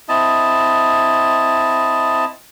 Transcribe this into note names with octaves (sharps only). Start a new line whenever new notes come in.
C4 E4 D#5 A5